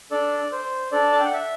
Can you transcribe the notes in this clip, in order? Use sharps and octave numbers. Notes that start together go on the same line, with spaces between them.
D4 A4 D5
C5
D4 A4 D5
A5
G5
F#5
E5